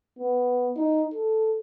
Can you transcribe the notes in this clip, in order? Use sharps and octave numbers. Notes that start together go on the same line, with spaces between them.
B3
D#4
A4